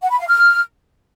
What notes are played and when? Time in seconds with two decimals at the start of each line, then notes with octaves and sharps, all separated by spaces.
0.02 F#5
0.10 B5
0.19 F5
0.28 F6